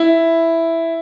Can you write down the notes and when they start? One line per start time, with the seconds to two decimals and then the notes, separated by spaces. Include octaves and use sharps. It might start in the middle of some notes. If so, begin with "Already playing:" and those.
Already playing: E4